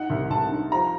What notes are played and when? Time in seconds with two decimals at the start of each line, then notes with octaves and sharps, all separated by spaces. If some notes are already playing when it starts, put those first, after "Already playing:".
Already playing: D#4 F#5
0.10 C2
0.30 C2 A5
0.51 D#4
0.72 F3 A#5